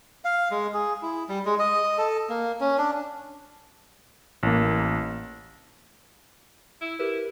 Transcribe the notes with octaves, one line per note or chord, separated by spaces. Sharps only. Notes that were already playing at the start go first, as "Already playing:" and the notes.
F5
G#3
G#4
E4
G3
G#3
D#5
A4
A#3
C#4
D4
A1 A#3
E4
E4 G4 A#4 B4